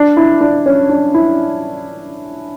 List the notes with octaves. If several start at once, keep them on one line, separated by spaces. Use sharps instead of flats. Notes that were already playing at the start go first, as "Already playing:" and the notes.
Already playing: D4
E4
D4
C#4
D4
E4